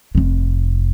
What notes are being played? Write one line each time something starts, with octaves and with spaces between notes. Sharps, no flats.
F1 C3